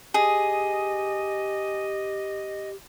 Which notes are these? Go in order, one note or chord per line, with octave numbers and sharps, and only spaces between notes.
G4 G#4 D#5